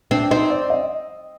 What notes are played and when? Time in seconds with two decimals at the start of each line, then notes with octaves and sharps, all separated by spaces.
0.11 C4 D4
0.31 C4 D#4
0.50 D5
0.70 D#5